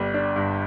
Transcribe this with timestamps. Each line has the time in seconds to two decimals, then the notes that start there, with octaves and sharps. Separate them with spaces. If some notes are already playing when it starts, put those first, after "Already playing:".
Already playing: G1 G3
0.14 D4
0.36 G2